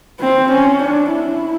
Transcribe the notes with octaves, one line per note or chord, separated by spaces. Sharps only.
C4
C#4
D4
E4